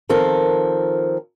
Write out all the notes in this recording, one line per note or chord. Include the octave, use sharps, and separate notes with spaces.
D#3 F3 C4 A4 A#4